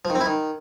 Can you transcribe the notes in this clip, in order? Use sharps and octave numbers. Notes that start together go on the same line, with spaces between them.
F3
D#3
C4
E4
D#3